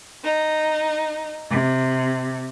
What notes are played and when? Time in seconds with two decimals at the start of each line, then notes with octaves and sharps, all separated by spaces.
0.23 D#4
1.50 C3